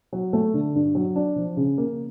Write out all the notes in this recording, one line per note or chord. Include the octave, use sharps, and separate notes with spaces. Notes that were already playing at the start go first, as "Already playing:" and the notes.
F#3
A3
D3
G2
F#3
D4
F3
C#3
A#3